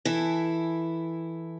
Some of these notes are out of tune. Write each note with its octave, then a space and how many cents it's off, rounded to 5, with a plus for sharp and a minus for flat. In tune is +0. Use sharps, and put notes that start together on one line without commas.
E3 +0 E4 +0 A4 +0